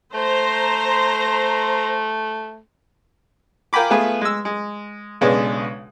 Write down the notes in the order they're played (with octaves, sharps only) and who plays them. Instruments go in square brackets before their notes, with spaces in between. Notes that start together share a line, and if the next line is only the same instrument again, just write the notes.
[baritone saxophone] A3 [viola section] C5 A#5
[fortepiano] F4 A#4 G5 G#5 B5 D6
A3 B3 F4 G#4 B4
G#3 E6
G#3
B1 C#3 G#3 B3 D4 G#4